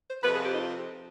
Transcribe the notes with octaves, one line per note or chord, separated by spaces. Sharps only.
C5
F2 C3 F3 B4
G#4
G4
D#4